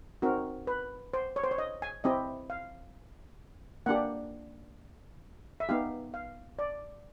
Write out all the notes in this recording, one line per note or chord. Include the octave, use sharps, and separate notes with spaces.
C4 D#4 F#4 A#4
B4
C5
C#5
C5
C#5
D#5
G#5
C4 E4 G4 D#5
F5
A#3 D4 G4 F#5
E5
B3 D#4 G4 F5
F5
D5